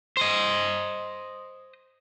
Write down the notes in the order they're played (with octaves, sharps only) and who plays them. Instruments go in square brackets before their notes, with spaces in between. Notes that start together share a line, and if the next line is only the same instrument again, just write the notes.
[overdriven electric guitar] C5 D#5